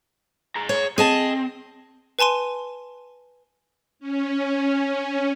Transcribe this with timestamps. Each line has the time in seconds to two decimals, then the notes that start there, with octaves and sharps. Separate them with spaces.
0.56 G#4 A#5
0.69 C#5
0.98 C4 G#4 D#5 A5
2.19 B4 G#5 A5 C6 D#7
3.99 C#4